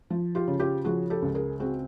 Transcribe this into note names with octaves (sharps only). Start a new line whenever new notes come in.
F3
F4 G4
C#3
F4 G4
F3 F#4 G#4
G4 A4
C#2
G#4 A#4
C4 F#4 G#4